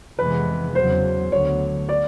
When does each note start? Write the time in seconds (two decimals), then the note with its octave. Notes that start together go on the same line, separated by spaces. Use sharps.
0.19 F2 C3 E3 G#3 B3 B4
0.75 E2 C#3 F#3 C5
1.32 D2 D3 F#3 B3 C#5
1.89 D5